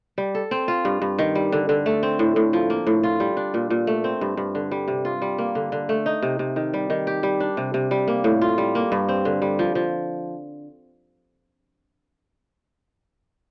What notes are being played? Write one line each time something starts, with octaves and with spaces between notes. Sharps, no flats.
G3
A4
C4
F4
G2
G2
D#3
G3
D3
D3
A3
C4
A2
A2
F3
A#3
A2
F4
G3
D4
A#2
A#2
A3
C4
G2
G2
D3
G3
C3
F4
G3
A#3
D3
D3
A3
D#4
C3
C3
D#3
G3
D#3
G4
G3
D4
C3
C3
G3
A#3
A2
F4
G3
A#3
G2
C4
D3
G3
F3
F3